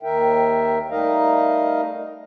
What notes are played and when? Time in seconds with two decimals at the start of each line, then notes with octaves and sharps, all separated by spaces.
0.03 D#2 D#3 A#4 E5 G5
0.90 G3 A3 D#4 A#4 D#5 F5